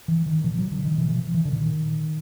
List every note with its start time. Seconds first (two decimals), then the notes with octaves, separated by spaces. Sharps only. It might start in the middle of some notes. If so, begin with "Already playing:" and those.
0.08 E3
0.26 D#3
0.44 A#2 F3
0.58 F#3
0.71 D3
0.85 D#3
0.98 B2 E3
1.09 E3
1.16 F3
1.34 E3
1.45 D3
1.52 A#2 D#3